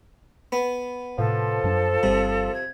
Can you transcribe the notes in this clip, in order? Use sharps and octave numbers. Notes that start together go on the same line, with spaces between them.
B3
A2 C3 F3 A4
F#2 F#3 D4
G1 C3 G3
G#6